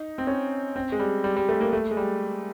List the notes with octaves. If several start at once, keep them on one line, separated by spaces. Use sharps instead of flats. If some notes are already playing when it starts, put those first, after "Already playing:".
Already playing: D#4
C4
C#4
C4
G#3
G3
G3
G3
A3
A#3
A3
G#3
G3